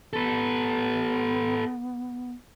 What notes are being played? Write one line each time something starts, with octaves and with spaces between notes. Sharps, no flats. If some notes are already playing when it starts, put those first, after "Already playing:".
B3 A4 B4